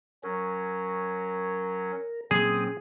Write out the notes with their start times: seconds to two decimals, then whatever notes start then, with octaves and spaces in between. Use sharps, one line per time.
0.23 F#3 C#4 A#4
2.31 A#2 F#3 A#3 C4 C#4 G#4 D#6